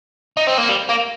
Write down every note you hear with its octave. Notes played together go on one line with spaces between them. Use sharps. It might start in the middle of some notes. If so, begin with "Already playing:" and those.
D#4
C4
A#3
G3
A#3